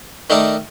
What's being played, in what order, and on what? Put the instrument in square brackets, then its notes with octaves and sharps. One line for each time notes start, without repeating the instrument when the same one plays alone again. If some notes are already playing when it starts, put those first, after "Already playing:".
[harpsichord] D#3 A3 D#4 A#4 D5